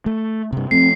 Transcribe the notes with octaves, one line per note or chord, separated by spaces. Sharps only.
A3
G2 C3
F3 F#3 A3 C4 C7